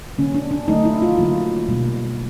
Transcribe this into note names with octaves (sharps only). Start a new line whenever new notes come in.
D3 F#3 A#3 C#4
D4
D4
D3 F#3 A3 D#4
E4
F4
D3 F#3 A#3
B2 G3 A#3